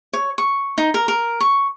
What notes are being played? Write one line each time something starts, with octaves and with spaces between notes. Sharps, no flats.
C#5
C#6
D#4
A#4
A#4
C#6